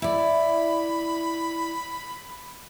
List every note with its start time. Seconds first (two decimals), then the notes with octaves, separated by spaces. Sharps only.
0.02 E4 D5 B5